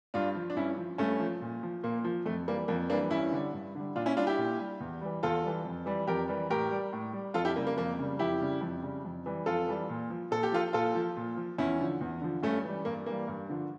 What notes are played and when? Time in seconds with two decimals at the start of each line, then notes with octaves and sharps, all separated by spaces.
0.14 G2 D4 F4
0.35 F3
0.50 D4
0.56 G2 C#4 E4
0.78 F3
0.98 G2 A3 C#4
1.20 F3
1.41 A#2
1.63 F3
1.83 A#2 A#3
2.04 F3
2.26 F2 A3
2.48 E3 G3 A#3
2.68 F2 A#3
2.90 E3 G3 A#3 D4
3.10 G2 C#4 E4
3.31 D3 G3
3.53 G2
3.75 D3 G3
3.96 A#2 D4 F4
4.06 C#4 E4
4.17 G3 D4 F4
4.27 E4 G4
4.38 A#2
4.59 G3
4.80 E2
5.01 E3 G3
5.23 E2 F4 A4
5.44 E3 G3
5.65 F2
5.86 E3 G3
6.07 F2 G4 A#4
6.28 E3 G3
6.50 A2 G4 A#4
6.71 G3
6.93 A2
7.13 G3
7.34 F2 F4 A4
7.45 E4 G4
7.56 C#3 G3 A#3
7.67 A#3
7.77 F2 A#3
7.98 C#3 G3
8.19 F2 E4 G4
8.40 C#3 G3
8.61 F2
8.82 C#3 G3
9.05 F2
9.26 E3 G3
9.46 F2 F4 A4
9.68 E3 G3
9.89 A#2
10.10 F3
10.31 A#2 A4
10.43 G4
10.52 F3 F4 A4
10.73 A#2 F4 A4
10.95 F3
11.16 A#2
11.37 F3
11.58 E2 C#4 E4
11.80 D3 F3
12.01 E2
12.21 D3 F3
12.43 G2 A3 C#4
12.64 E3 G3
12.85 G2 A#3
13.06 E3 G3 A#3
13.28 G2
13.49 D3 F3